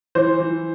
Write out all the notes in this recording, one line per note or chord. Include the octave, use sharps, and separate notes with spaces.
E3 C5
E3